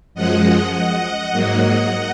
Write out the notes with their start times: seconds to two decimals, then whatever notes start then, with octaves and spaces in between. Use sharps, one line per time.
0.14 F#2 F3 G#3 D#5 F#5
0.73 D#5 F#5
1.32 G#2 F#3 A#3